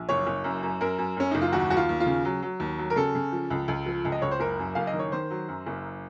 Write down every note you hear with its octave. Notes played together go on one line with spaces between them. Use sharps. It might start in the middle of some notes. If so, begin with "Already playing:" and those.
Already playing: A#1
F#1 C#5
F#1
F#2
F#2
F#2 A#4
F#2
F#2 C#4
F#1 D#4
F4
D#2 F#4
D#2 F#4
F4
D#2
F4
C#3
F#3
F#3
D#2
F#3
A#4
C#3 A4
C#3
F3
C#2
C#2
F3
C#2
D#5
C#2 C#5
C5
F#1 A#4
F#2
F#1 F5
D#5
D#3
C#5
D#3 C5
F#3
F#2
F#1